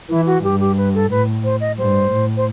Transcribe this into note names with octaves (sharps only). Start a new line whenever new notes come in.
E3 E4
F#4
G2 G4
G4
B4
A4
A2 B4
C5
D#5
G2 C5
A2
C5